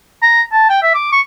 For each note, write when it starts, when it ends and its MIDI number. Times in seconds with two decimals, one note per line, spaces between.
0.22 0.42 82
0.52 0.66 81
0.69 0.80 79
0.82 0.93 76
0.94 1.12 86
1.12 1.21 85